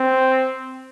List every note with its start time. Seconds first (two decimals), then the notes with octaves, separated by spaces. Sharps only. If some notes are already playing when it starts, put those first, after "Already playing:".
Already playing: C4